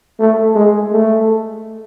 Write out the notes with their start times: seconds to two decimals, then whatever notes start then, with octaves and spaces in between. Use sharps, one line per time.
0.19 A3
0.55 G#3
0.92 A3